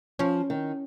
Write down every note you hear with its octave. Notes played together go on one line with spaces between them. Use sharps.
F3 C#4
D#3